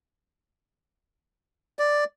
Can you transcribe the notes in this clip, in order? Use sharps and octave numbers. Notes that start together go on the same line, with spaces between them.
D5